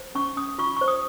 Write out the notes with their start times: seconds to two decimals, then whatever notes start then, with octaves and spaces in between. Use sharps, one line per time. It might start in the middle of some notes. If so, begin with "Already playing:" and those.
Already playing: C5
0.15 C#4 C#6
0.37 C#4 D#6
0.58 F4 C#6
0.77 C5 C#6
0.88 D#6